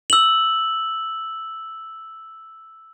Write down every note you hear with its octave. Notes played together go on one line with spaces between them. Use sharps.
E6 F#7